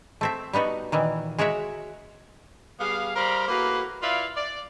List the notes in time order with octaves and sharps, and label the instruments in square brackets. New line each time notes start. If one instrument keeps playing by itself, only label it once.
[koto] A3 C4 E5
G3 B3 D#4 F#4
A#2 D#3 E3
G#3 F#4 A#4 C#5 E5
[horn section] G3 B3 G#4 F5
G3 A#4 C5 F5 A#5 B5
A2 A#3 F#4 G#4 B4
E4 F4 B4 D5 F5
D5